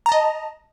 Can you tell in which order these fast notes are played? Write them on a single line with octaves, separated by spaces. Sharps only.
A#5 A5 D#5